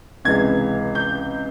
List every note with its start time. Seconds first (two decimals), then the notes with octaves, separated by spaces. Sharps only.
0.25 C#2 C3 E3 G#3 G#6
0.95 G6